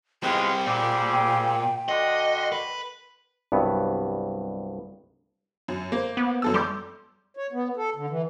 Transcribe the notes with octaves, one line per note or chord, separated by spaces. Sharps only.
G3 G#3 B3 C4 F4 G5
A#2 G3 C4 G#4
D3 F#4 D#5 C6
B4
C2 G2 F#3 B3
F#2
A#3 C5
B3
F#2 A4 E6
G3 C6 D6 G6
C#5
B3
A4
D3
E3